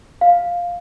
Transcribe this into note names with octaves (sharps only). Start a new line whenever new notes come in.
F5